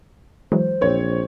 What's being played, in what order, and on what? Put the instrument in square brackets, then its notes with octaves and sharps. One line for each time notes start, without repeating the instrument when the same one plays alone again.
[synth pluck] E3 F#3 G#3 [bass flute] C5
[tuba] A#1 [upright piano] C4 C#5